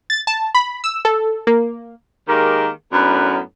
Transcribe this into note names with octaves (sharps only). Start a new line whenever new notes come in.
A6
A5
B5
E6
A4
A#3
D#3 G#3 A#3 G4 A#4
F#2 A2 B3 D4 A#4 B4